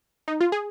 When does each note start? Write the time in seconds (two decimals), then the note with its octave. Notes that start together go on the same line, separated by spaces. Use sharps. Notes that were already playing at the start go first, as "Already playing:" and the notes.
0.28 D#4
0.41 F4
0.52 G#4